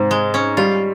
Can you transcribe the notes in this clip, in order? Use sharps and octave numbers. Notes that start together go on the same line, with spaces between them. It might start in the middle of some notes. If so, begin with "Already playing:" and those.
Already playing: G#2 C3
G#3
C#4
G3 F4